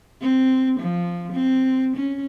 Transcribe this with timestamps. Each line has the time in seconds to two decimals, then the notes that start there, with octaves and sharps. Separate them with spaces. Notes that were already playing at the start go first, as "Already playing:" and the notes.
0.22 C4
0.80 F3
1.33 C4
1.96 C#4